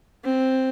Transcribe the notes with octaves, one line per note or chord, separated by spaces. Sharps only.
C4